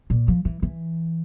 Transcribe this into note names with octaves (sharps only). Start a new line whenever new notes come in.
A#2
F3
E3
E3